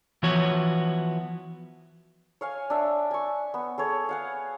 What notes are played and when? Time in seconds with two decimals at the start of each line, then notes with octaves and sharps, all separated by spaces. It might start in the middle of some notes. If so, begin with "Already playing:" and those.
0.23 E3 F3 B3 F#4 C#5
2.41 C#5 F5 G#5
2.70 D4 E5
3.11 G#5 C#6
3.54 B3
3.78 G#4 A4 C#5
4.09 F5 F#5 G#5